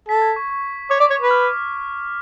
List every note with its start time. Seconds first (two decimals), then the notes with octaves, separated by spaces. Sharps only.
0.08 A4 B6
0.22 G#6
0.36 C#6
0.50 C#6
0.90 C#5 D6
1.00 D5
1.10 C#5
1.20 B4
1.31 F6